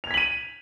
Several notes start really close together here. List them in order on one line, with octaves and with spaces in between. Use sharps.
F7 G#6 B6 F#7 D#7